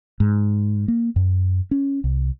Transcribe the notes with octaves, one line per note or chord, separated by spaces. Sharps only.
G#2
A#3
F#2
C#4
C2